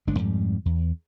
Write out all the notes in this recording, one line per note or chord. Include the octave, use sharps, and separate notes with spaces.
G1 G#3 D4
F2 G#2 G3
E2